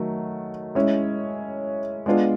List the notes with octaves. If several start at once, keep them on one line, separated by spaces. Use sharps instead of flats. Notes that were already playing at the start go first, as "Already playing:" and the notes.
Already playing: D#3 F#3 A3
G#3 C#4 E4
G#3 B3 D4 F4